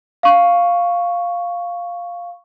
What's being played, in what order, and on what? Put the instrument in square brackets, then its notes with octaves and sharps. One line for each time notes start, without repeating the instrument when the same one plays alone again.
[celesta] F5 C#6